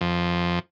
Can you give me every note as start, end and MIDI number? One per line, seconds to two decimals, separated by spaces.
0.01 0.59 41